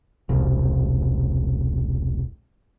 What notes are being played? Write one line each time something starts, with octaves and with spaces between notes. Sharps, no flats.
E1 C2